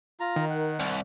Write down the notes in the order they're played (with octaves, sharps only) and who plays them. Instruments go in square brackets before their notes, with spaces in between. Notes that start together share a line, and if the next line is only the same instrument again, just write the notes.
[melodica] F4 A#5
[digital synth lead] D#3
[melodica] F#5
[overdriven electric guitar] C2